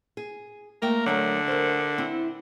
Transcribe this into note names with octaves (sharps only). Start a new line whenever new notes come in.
G#4
A3 A#3 A#4 G5
D3 F#3 A3 A#4
A#4 C5
C4 E4